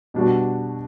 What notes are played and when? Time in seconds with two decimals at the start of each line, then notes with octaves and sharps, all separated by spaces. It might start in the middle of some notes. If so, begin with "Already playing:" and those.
0.14 B2 G3 D4 F#4